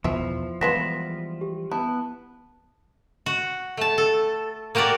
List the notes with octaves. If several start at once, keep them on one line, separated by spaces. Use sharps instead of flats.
E2 B2 F3 B3 E4 E5
E3 G3 G#3 B3 F4 A#6 B6 E7
G4
B3 E4 A5
F#4
A3 A5
A4
A#3 F#4 G4 A#4 D5